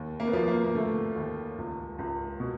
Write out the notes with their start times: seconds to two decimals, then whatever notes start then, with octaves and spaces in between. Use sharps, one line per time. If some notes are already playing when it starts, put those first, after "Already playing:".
Already playing: D#2
0.20 A#3
0.27 B3
0.33 F3 A#3
0.48 A#3
0.64 A#3
0.75 D3 A3
1.16 D#2
1.58 C#2
1.98 C#2
2.40 B2